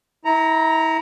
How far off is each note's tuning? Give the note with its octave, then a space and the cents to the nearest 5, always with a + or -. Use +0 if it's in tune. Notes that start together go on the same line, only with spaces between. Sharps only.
E4 -30 A#5 +0